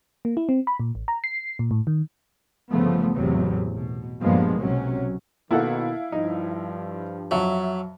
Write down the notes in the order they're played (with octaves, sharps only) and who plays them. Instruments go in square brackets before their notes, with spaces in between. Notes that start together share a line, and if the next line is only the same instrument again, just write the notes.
[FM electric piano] A#3
E4
C4
B5
A#2
A1
A#5
C7
A#2
A2
D#3
[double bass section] G1 C#3 F3 A3 B3
A1 E2 C3 F#3
B2
G2 A#2 F3 G#3 A#3 B3
B1 C3 F#3 C#4
[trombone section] B2 D#3 [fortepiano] A#3 A4 F#5 [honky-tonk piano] E4 F5
[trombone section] G2 F3 [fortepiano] D#4
[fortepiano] F2 [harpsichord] F#3 [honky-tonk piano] E5